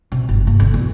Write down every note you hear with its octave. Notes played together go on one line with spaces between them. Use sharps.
C3
G1
A#3
D3
E2